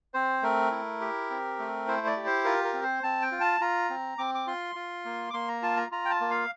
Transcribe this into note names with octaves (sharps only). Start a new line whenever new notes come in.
C4 C5
A3 A#4
E4
G4
C4
A3
E4 C5
D5
G4
C5
F4 A#4
A#4
C4
C5
C4 A5
G5
F4
A5
F4 A#5
C4
C4 D6
D6
F4 C6
F4
A#3
D6
A#3 C6
A#5
F4 A5
A#5
F4 A#5
G5
A5
A#3
F5